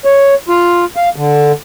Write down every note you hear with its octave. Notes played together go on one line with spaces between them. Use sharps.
C#5
F4
F5
D3